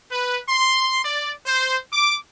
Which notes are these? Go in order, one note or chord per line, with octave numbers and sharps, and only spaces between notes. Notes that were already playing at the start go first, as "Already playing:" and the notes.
B4
C6
D5
C5
D6